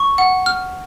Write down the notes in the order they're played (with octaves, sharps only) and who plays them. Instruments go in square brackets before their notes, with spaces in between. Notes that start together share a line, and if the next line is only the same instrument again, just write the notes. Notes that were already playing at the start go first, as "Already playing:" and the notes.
Already playing: [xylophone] C#6
F#5
F6